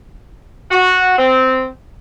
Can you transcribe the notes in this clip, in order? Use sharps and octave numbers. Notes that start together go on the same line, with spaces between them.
F#4
C4